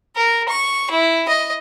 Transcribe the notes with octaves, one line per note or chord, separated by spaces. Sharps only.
A#4
C#6
E4
D#5